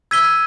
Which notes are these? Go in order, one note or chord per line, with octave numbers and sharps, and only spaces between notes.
E6 G#6 B6 D#7 G7